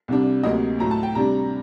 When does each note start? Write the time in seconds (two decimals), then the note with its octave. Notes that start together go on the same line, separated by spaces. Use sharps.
0.08 C2 C3 G3 D4
0.43 D2 C3 F#3 A#3 D#5
0.79 A2 F#3 A3 A#5
0.91 A5
1.03 G5
1.15 C3 G3 D4 A#5